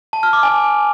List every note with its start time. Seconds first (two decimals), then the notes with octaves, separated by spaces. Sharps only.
0.13 A5
0.23 F6
0.33 D6
0.43 G#5